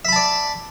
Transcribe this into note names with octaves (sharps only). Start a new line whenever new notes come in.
D5 E5 A5 B5